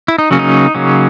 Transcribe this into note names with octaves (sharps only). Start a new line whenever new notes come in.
E4
D#4
C#3 F#3 A#3 C#4
D#4
C#3 F#3 A#3 C#4